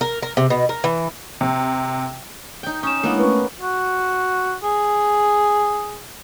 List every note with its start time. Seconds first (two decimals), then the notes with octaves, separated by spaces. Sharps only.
0.01 A#4
0.22 A#4
0.37 C3
0.50 B2
0.69 A#4
0.84 E3
1.41 C3
2.63 D#4 G5
2.83 C#4 D#6 E7
3.03 G#3 A#3 B3 D4 E4 D#5
3.18 A3 C#4 B4 C#6
3.61 F#4
4.63 G#4